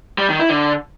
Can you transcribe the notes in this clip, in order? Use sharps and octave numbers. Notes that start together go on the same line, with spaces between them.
G3
D#3
E4
D3